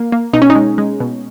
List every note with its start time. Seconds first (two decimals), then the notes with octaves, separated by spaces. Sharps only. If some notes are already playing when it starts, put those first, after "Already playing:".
Already playing: A#3
0.12 A#3
0.33 B2 D#4
0.42 C#4
0.50 D#4
0.56 G#3
0.78 G#3
1.00 B2